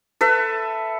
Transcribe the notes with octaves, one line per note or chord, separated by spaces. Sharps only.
A4 B4 E5